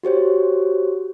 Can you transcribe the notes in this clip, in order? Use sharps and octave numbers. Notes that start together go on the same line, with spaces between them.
F#4 G4 C5 C#5